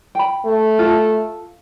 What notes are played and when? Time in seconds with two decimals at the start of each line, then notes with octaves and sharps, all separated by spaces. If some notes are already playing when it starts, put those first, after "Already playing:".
0.15 G5 B5
0.45 A3
0.79 F4 A4